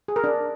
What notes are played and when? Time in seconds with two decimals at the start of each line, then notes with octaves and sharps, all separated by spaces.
0.08 G#4
0.16 A#4
0.24 D4